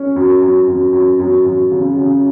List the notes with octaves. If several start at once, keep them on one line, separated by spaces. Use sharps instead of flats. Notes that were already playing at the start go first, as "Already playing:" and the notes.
Already playing: C#4
F#2
F#2
F#2
F#2
F#2
F#2
C#3
C#3